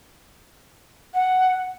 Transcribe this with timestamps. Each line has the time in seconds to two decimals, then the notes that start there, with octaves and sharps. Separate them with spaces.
1.14 F#5